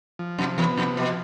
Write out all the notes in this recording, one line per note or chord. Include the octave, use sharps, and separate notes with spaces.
F3
F2 C3
E2 B3
F2 C3
B2 F3